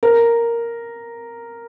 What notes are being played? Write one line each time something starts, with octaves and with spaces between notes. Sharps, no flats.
A#4